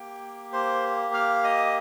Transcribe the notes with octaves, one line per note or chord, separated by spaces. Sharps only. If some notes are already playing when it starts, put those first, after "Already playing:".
Already playing: A#3 G4 G5
C5 C6
F5 F6
D#5 D#6